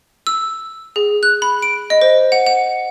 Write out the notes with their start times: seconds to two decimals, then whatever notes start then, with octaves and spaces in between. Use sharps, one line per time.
0.27 E6
0.96 G#4
1.23 F#6
1.42 B5
1.62 D7
1.90 D#5
2.01 C5
2.32 F#5
2.46 F#5